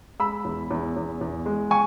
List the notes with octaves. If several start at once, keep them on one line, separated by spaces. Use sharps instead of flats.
G#3 B5 E6
E2
E2
E2
E2
G#3
G#5 C#6